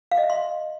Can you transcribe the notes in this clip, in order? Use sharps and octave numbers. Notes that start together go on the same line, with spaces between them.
F5
D#5
E5
C6